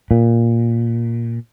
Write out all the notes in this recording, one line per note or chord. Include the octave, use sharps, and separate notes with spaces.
A#2